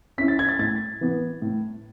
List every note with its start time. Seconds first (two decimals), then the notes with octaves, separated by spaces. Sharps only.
0.18 C#4 E4 B6
0.28 A6
0.39 G#6
0.49 A6
0.59 A2 A6
1.01 E3 B3
1.42 A2